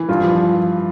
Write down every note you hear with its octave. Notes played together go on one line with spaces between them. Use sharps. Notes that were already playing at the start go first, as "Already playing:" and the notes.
Already playing: E3
G2 F4
F3